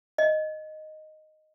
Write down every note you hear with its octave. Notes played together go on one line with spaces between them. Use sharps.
D#5